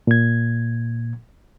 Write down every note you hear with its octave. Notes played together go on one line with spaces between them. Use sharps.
A#2 G#6